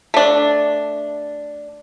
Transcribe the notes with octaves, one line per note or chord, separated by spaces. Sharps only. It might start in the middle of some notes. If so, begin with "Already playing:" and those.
A3 D4